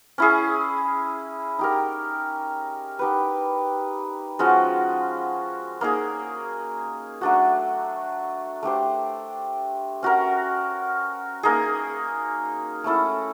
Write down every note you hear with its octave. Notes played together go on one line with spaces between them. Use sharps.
C#4 E4 G#4
D#4 G4 A#4
D#4 G4 B4
F3 G#3 C#4 F#4
A#3 D#4 G#4
F#3 A3 D4 F#4
A3 D4 G4 C5
C#4 F#4 A#4
A#3 D#4 G#4
A3 C#4 E4 A4